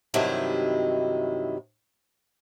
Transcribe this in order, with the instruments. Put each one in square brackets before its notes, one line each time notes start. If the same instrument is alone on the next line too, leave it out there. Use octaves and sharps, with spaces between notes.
[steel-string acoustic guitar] G2 C3 D#3 F#3 D#4 E4